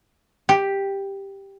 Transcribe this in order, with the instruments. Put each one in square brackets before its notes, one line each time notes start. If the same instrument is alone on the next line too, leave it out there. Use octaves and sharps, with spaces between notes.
[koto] G4